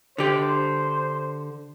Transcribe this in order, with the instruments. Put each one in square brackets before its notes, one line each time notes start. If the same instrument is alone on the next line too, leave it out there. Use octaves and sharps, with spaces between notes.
[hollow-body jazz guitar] D3 G4 [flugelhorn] C5